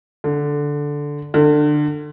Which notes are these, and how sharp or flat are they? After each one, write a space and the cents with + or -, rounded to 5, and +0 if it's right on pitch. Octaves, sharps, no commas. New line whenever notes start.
D3 -5
D3 +25